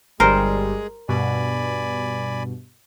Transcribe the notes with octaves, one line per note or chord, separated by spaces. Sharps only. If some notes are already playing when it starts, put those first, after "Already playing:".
G1 G3 G#3 G#4 A#4 C5
G2 B2 D5 G#5 B5